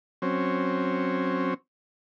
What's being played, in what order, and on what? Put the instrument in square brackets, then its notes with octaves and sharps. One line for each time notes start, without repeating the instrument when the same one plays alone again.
[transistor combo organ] F#3 C4 C#4